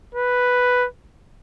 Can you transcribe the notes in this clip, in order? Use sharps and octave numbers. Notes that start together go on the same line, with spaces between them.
B4